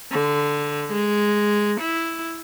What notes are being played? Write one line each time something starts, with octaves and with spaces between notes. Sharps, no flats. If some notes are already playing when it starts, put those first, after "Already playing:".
D3
G#3
E4